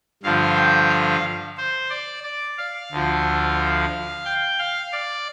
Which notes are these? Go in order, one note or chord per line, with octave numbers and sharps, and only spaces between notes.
G2 D3 F3 F5
G5
F5
C5
D5
D5
F5
D2 D3 F3
G5
F5
D5